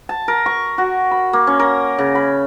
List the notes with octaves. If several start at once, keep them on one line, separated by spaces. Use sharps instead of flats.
A5
A#4
C#6
F#4
B5
A#3
C#4
A#4
C#3
B5